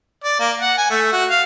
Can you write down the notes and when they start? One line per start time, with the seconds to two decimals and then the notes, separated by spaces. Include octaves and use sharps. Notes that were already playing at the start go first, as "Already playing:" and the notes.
0.24 D5
0.40 A#3
0.60 F#5
0.77 G#5
0.90 A3
1.12 F#4
1.30 F5